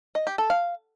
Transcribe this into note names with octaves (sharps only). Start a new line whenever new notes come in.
D#5
G4
A4
F5